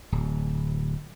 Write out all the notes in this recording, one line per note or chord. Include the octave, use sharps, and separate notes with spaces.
D1